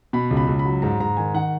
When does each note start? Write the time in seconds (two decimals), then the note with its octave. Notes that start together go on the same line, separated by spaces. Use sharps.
0.13 B2 B5
0.31 C#2
0.37 B5
0.47 C#2
0.59 B5
0.65 F#3
0.82 G#2 A#5
1.00 G#2 A#5
1.17 D#3 G#5
1.34 D#3 F#5